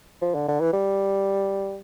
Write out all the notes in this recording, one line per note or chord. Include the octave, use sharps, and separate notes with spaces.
F3
D3
D3
E3
G3